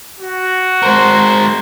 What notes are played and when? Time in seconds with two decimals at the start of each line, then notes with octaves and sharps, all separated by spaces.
0.19 F#4
0.82 G#3 A#4 C5